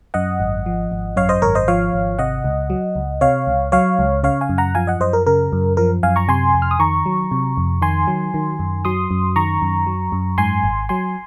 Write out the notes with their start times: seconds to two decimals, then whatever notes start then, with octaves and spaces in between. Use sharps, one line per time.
0.14 F#2 D#5 F#5
0.40 G#1
0.66 F3
0.92 G#1
1.16 F#2 C#5 F5
1.29 C5 D#5
1.42 G#1 A#4 C#5
1.55 C5 D#5
1.68 F3 C#5 F5
1.94 G#1
2.19 C3 D#5 F#5
2.44 C#2
2.70 F#3
2.96 C#2
3.21 C3 C#5 F5
3.47 C#2
3.72 F#3 C#5 F5
3.99 C#2
4.23 C#3 C#5 F5
4.41 F5 G#5
4.49 F#2
4.58 F#5 A#5
4.75 F3 F5 G#5
4.87 D#5 F#5
5.00 F#2 C5 D#5
5.13 A#4
5.26 C#3 A#4
5.53 F#2
5.77 F3 A#4
6.03 F#2 F5 G#5
6.16 A#5 C#6
6.28 C3 G#5 C6
6.54 F2
6.62 F6
6.71 D#6
6.79 D#3 A#5 C#6
7.06 F#3
7.31 C3
7.57 F2
7.82 D#3 G#5 C6
8.07 F#3
8.34 D#3
8.59 F#2
8.85 F#3 C6 D#6
9.11 F#2
9.36 D#3 A#5 C#6
9.62 F#2
9.87 F#3
10.12 F#2
10.38 G#2 G#5 C6
10.63 G#1
10.89 F#3 G#5 C6